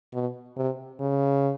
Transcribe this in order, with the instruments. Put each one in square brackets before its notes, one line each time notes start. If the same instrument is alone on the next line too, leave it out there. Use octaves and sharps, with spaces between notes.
[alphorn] B2
C3
C#3